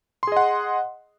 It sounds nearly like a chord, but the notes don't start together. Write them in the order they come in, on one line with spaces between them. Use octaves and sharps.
C6 G#4 D#5 F#5